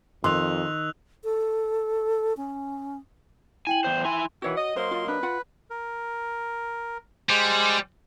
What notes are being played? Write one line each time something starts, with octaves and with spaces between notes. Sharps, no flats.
F2 D#3 C6 E6 F#6 F7
A4
C#4
E4 G5 G#5 F#7
E2 C5 G5
E4 G#5 C6
B2 D#3 E3 F#4 C#5 F#5
D#5
F#3 A#3 C5 D#5 C6
F4
D4 B4
F4 F#5
A#4
G3 G#3 C5 G#5